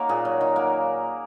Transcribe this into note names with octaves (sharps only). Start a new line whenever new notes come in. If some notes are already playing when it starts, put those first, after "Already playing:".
Already playing: A#3 C#4 D#4 F#4 A#4
A#2 G#4
F#3
D#3
A#3